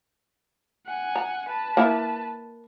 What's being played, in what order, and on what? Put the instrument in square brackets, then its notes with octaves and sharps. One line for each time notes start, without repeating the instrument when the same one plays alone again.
[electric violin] F#5 G#5
[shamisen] A#5
[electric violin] B4 A5
[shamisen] A#3 E4